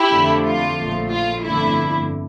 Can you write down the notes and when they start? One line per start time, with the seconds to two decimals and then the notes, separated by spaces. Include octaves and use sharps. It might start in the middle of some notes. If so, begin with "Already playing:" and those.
Already playing: E4 G4
0.12 F2 D3 F3 A3
0.46 F4
0.78 A#1 A2 F3 A3
1.11 F4
1.43 G1 F2 D3 A3 E4